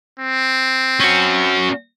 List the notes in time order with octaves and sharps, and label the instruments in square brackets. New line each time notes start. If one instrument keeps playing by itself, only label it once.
[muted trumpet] C4
[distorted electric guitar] C#4 F#4